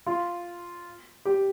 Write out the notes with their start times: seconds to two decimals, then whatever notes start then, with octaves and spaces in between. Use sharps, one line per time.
0.06 F4
1.25 G4